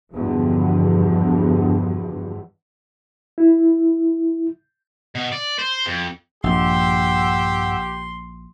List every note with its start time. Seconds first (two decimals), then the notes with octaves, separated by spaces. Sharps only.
0.14 E2 G2 B2 D3 F3
3.38 E4
5.15 B2
5.32 D5
5.59 C5
5.86 F2
6.44 A#1 G2 G4 F#5 C6 E6